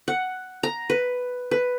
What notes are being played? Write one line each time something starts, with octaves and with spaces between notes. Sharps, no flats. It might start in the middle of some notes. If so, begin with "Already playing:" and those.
F#5
A#5
B4
B4